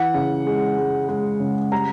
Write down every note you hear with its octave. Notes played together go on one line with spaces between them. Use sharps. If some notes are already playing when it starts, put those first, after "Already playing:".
Already playing: E3 F#5
C#3
G#3
G#3
G#3
C#3
G3 A#5